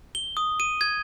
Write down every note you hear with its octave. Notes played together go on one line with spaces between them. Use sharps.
G7
D#6
D#7
G#6